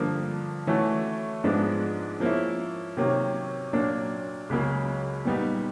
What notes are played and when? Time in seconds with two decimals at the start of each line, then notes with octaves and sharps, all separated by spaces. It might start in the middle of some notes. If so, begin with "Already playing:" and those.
Already playing: G2 D3 F3 A#3
0.67 E3 A3 C#4 F#4 A4
1.44 G#2 F3 G#3 B3 D4
2.20 F3 A#3 C#4 E4
2.97 C3 D#3 F#3 A#3 C#4
3.73 A#2 F#3 A#3 D4
4.50 C#2 C#3 F#3 A#3
5.25 A#2 G3 B3 D#4